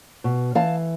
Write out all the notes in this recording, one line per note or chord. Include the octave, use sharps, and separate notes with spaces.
B2
E3 F5 A5